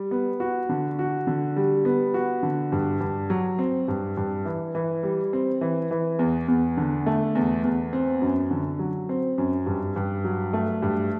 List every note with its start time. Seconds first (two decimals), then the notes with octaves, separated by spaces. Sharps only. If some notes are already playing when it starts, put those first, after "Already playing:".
Already playing: G3
0.11 B3
0.40 F#4
0.69 D3
0.99 F#4
1.27 D3
1.56 G3
1.85 B3
2.14 F#4
2.43 D3
2.72 G2
3.01 G2
3.30 F#3
3.59 C4
3.88 G2
4.17 G2
4.45 E3
4.75 E3
5.03 G3
5.33 C4
5.61 E3
5.91 E3
6.19 E2
6.48 E2
6.77 D3
7.06 A3
7.35 E2
7.63 E2
7.93 C4
8.22 F#2
8.51 D3
8.79 F#3
9.09 C4
9.38 F#2
9.66 G2
9.96 G2
10.24 F#3
10.53 A3
10.82 G2